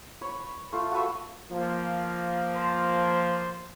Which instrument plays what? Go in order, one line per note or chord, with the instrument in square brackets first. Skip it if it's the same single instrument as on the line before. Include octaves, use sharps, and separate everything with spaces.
[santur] B4 C#5
B5
A3 F4
F#4 A4 B4 E5
[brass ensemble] F3 A#3
[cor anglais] C5